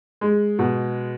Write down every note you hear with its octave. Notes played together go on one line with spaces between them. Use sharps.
G#3
B2